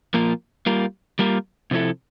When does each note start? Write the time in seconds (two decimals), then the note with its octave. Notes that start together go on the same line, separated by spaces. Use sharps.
0.14 A#2 F3 A#3 F4 A#4
0.66 G3 A#3 F4 A#4
1.19 G3 A#3 F4 A#4
1.71 C3 F3 C4 E4 A4